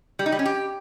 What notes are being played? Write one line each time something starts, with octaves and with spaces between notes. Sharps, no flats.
G3
D#4
G3
C#4
G4